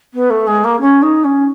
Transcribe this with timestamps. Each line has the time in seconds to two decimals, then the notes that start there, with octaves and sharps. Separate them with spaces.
0.13 B3
0.30 A3
0.47 G#3
0.64 A#3
0.80 C#4
1.02 D#4
1.24 C#4